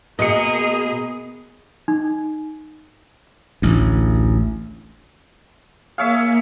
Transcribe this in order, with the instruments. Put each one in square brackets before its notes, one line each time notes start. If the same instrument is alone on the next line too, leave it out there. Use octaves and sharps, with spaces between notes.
[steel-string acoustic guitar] B2 [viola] A#3 G#4 [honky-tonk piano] D#5 C#7
[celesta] D#4
[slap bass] A1 D2
[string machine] A#3 [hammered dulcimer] G#4 C#5 E5 [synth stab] F5